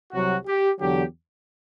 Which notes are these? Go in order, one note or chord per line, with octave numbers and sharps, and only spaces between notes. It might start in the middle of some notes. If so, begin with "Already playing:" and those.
C2 C3 F#3 F#4
G4
E2 D3 F#3 G4